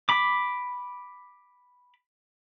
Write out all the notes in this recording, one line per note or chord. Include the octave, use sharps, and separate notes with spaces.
B5 D6